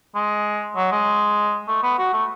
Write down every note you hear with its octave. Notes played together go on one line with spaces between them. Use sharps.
G#3
F#3
G#3
A3
B3
F#4
A3